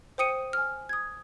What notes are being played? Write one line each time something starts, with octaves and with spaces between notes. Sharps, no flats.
C5 G5 D#6 C#7 D#7
G#5 F6
D#6 G#6